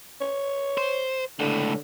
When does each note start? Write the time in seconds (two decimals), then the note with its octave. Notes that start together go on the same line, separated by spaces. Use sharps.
0.21 C#5
0.78 C5
1.40 C#2 A2 D3